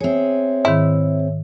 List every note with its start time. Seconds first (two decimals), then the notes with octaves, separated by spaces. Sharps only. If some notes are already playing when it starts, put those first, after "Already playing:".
0.01 C4 G#4 C#5 E5
0.65 G#2 D#3 E4